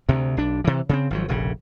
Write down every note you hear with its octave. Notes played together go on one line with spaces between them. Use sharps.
D2 C3
B1 D4
C3 E3
C#3 B3 C4
G#1 F3 F#3
F1 A#1 C#3